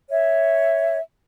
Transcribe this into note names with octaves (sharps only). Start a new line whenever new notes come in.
C#5 E5